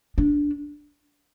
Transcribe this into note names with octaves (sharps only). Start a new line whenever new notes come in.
D4